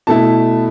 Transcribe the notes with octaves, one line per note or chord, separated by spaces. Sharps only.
B2 A3 E4 A5